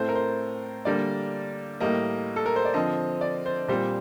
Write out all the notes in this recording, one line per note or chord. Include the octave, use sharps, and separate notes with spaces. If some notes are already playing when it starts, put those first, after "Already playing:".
Already playing: A2 A3 C4 C5
A#4
C5
D3 G3 A#3 D5
A2 G3 A#3 D#5
A4
A#4
C5
D5
D3 F3 C4 D#5
D5
C5
A#2 G3 C4 C5